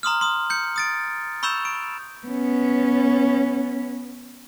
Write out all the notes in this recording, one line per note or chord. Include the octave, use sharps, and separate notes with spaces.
A#5 C6 D#6 F6
C6 D#6
G6 C#7
D#6 A6 D7
B5 C#6 E6 G6 E7 F7
D7
B3 C#4